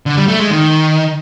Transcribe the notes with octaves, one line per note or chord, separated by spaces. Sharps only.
D3
G3
A3
G#3
D#3